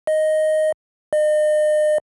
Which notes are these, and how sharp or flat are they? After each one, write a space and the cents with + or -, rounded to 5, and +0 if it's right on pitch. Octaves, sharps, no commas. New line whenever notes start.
D#5 +0
D#5 -40